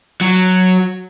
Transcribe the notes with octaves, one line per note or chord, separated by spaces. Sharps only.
F#3